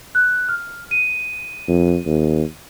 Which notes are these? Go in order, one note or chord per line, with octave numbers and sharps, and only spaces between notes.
F#6
F6
D#7
F2
D#2